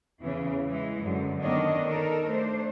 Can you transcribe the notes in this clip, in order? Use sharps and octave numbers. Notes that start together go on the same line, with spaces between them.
E2 C#3 E3
E3 G#3
F#2 D3
D#3 B3 D4 C#5 D#5
D#4 A4 A#4
A3 D4 C5